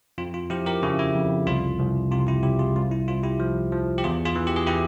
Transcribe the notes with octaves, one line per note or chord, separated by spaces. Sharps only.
F2 F4
F4
F3 E4 G4
G4 A#4
C#3 E4
E4
F2
C2 F4
C2
C3 F4
E4 G4
C2 E4 G4
F4 G#4
C2 F4
E4
C2 F4
E4 G4
F3
F3
G4
E2 F4 G#4
F4 G#4
E3
G4
G#4
E3 E4 G4